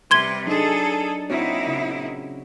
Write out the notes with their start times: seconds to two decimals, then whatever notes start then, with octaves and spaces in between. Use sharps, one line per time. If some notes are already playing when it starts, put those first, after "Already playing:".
0.11 C3 G3 B4 C6 G#6 G7
0.47 F#3 D4 D#4 G#4 A4
1.30 A#2 C4 D#4 E4 F#4 C#5
1.67 C#3